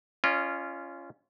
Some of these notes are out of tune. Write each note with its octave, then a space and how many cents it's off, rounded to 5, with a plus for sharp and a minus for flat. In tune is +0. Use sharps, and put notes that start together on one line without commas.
C#4 +0 F4 -20 D#5 -45